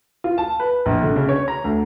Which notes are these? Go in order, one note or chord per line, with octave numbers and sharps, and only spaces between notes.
F4
A5
B4
A#1
D3
C#3
C#5
A#5
D2